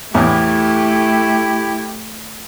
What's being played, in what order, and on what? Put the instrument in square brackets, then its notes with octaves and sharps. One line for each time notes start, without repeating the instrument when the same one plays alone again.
[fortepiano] E2 A2 [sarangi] A3 [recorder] E4 [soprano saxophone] G4